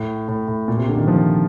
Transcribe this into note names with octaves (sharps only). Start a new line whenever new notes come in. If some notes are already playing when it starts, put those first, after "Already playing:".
Already playing: A2
A2
A2
A#2
C3
D3
D#3
F3